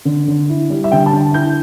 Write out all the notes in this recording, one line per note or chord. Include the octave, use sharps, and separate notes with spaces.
D3
D3
E4
G3
E5
D3 G5
A5
D3
E4 G6